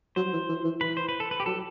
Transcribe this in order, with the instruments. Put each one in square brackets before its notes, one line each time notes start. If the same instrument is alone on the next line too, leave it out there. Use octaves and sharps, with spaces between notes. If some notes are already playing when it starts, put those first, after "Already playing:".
[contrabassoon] F#3 [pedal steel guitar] C5
[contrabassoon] E3
E3
E3
[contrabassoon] E3 [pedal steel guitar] B4
[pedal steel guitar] C5
B4
A4
B4
G4
[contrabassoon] F#3 [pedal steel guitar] A4